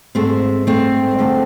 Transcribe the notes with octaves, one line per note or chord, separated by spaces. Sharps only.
G#2 G#3 A3 C4
A3 C4
F2 D3 F3 A3